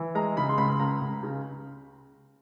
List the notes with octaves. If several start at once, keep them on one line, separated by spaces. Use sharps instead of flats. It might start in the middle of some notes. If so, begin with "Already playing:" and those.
Already playing: E3
G#3 A#5
C#3 B5
C6
C#2 B5
C#2 A#5
C#2
C#3